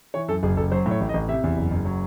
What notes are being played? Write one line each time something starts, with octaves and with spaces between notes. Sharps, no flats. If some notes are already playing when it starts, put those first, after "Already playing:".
E3 C#5
F#2 A4
F#1 G#4
F#1 A4
F#3 C5
A2
C#5
A1
D#5
A1
C3 E5
E2
F#1
F#1
F#3